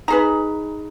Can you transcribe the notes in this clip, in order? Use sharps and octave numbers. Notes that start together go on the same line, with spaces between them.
D#4 G#4 B4 A#5